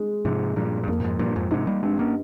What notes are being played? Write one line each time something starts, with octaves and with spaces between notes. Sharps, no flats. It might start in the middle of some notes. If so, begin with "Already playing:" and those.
Already playing: G#3
G#2 C3 F3
G2 A#2 F3
G2
F2 A#3
A#2
F2 G#2
G2 A#2 F3
F2 G#2
G#2 C3 D#4
G3 A#3
G2 G#3 C4
A#3 C#4